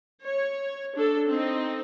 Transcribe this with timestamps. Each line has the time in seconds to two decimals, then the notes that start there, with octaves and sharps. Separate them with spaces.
0.20 C#5
0.94 D4 A4
1.27 C4 D#4